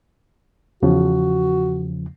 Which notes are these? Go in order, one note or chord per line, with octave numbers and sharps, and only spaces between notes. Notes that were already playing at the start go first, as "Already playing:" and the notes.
E2 C#3 F3 F#4